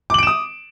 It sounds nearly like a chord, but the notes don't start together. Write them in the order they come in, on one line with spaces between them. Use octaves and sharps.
D6 F#7 D7 E7 D#6